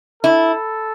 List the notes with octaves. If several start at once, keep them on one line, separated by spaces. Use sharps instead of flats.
E4 A4